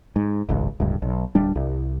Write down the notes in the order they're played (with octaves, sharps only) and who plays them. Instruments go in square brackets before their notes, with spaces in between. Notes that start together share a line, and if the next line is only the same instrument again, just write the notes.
[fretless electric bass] G#2
D#1 G#1 C#2
D1 C#2 G2
B1
D1 G3 D4
C2